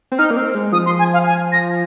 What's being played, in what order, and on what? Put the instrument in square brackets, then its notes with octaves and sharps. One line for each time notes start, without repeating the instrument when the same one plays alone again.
[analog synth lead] C4
[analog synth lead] D#4 [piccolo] F6
[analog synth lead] A#3
C4
G#3
[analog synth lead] F3 [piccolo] D#6
[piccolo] C6
G#5
F5
G#5
A#6